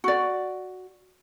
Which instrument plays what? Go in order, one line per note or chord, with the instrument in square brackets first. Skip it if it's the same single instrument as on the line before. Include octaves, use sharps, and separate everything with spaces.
[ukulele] F#4 D5